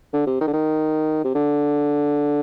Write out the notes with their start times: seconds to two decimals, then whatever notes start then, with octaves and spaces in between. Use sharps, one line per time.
0.13 D3
0.27 C3
0.41 D#3
0.48 D3
0.53 D#3
1.24 C3
1.35 D3